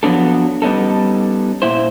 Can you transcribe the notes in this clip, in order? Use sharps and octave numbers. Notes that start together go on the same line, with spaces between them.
F3 F#3 B3 D4 A4
G3 B3 C#4 D#4 A4
A#2 E4 C5